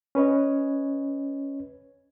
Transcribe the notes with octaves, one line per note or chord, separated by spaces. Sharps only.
C#4 B4 C#5 D#5